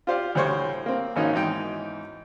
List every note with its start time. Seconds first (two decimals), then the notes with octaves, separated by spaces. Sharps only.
0.07 F4 G4 C5 D5 F5
0.35 D2 A2 G3 C5 C#5 C#6
0.86 A#3 C4
1.16 G#1 A#3 C#4 D#4 F#4
1.33 E2 G#2 D#4 G5